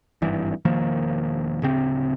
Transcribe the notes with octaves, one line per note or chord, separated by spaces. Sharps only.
G#1 G2 E3
E1 D#3 F3 A#3
D1 C#3 C4